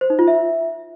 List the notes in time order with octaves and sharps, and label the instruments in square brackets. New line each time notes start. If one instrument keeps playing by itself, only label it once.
[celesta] C5
D#4
F4
E5